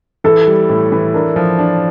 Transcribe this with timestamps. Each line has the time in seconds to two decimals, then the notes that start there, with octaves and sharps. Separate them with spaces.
0.24 E3 A4
0.47 G3
0.69 A2
0.92 E3
1.14 D4 A#4
1.36 F3
1.59 D4